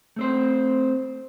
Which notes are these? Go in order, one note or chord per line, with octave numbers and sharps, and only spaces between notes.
A3 C4 C5